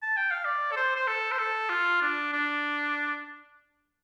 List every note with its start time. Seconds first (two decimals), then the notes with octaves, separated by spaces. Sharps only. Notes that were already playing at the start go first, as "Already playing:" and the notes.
0.02 A5
0.17 G5
0.31 F5
0.45 D5
0.71 A4
0.76 C5
0.96 C5
1.07 A4
1.31 C5
1.38 A4
1.69 F4
2.01 D4
2.32 D4